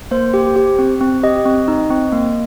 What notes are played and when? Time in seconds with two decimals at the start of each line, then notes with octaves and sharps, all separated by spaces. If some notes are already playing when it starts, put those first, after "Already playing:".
0.11 A#3 C5
0.34 G4
0.56 G4
0.79 C4
1.01 C4
1.23 G4 D#5
1.45 C4
1.68 D#4
1.90 C4
2.12 A#3